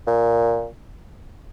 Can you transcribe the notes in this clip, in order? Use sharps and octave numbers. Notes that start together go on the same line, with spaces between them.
A#2